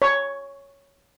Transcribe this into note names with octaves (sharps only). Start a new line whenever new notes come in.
C#5